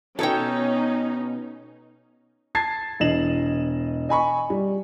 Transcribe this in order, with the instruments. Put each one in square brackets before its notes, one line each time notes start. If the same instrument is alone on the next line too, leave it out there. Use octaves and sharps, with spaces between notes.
[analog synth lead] B2 [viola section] C#4 D#4 [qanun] A4 C#5 G5
[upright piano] A5 G#6 A6 C7
E1 E3 D#5 E7 F#7
D#5 G#5 B5 C#6
G3